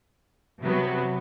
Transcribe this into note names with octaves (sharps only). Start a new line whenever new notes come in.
C3 F#3 B3